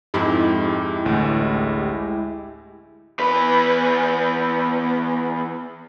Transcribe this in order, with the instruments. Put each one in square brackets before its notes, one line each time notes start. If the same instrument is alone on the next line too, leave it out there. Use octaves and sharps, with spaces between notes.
[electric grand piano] F2 G#2 [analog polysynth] G#3 E4 G4
[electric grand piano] A1 D2
[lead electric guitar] E2 B4